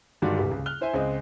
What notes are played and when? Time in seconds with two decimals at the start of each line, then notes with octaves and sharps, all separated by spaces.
0.22 G2 D3 D#3 G#3 D4 F#4
0.38 D#1 C2 G3 B4
0.52 C#2
0.66 F6 F#6 G7
0.81 E4 C5 E5 G#5
0.94 C#2 G#3 C4 D#5